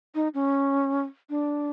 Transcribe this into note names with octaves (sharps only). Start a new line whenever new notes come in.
D#4
C#4
D4